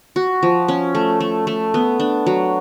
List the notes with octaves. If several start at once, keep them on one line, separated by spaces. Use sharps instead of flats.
F#4
F3
C#4
A3
A3
A3
B3
D4
F#3